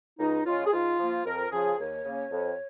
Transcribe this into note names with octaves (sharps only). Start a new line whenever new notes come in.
C#2 D#4
C#3 G#3 C#4 F4
G#4
G#2 F4
F3 A#3
F2 A#4
C#3 F3 G#4
D#2 C#5
C#3 A#3 C#4
F2